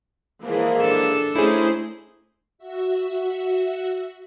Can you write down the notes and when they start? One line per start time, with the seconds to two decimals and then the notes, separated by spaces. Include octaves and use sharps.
0.44 G#2 E3 F3 A#3 G#4
0.81 D4 A4
1.36 A3 C#4 D#4 E4 G#4 C5
2.58 F#4 E5